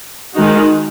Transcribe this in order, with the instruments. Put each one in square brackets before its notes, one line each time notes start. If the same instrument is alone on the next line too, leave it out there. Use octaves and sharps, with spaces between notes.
[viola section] D#3 G#3 D#4 F#4